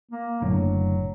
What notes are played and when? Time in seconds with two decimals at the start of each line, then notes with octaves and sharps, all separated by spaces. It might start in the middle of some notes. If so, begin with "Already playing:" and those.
0.11 A#3
0.42 F#1 A2 D3 F#3